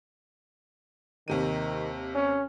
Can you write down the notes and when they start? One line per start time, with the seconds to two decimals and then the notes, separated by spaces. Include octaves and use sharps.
1.28 D#2 C3 D#3 D#7
2.15 C#4